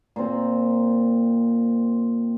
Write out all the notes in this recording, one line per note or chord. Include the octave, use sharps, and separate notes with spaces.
A#2 C4